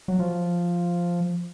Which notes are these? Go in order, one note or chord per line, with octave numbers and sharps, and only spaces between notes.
F#3
F3